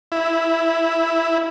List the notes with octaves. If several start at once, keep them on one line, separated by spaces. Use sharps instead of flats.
E4